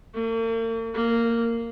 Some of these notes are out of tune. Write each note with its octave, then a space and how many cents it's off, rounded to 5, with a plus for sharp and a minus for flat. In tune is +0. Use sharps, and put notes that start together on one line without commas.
A#3 -45
A#3 -10